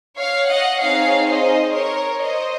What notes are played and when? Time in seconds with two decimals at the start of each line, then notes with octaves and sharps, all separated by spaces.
0.18 C#5 F5
0.50 D#5 F#5
0.81 C4 D#4 G#4 C#5 F5
1.28 C5 D#5
1.75 A#4 C#5
2.22 C5 D#5